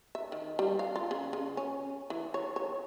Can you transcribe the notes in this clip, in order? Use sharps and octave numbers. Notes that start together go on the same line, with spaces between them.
E5
D#3
G3
F5
F4
C#3
C#3
C#4
E3
C#5
C#5